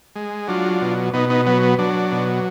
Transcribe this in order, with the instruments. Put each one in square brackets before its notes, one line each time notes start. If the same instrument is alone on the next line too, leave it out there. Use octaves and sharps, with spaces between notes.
[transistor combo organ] G#3
F#3 D4 F4
B2
B2 B3 D#4
B3 D#4
F#3 B3
B3
F#3 D4
B2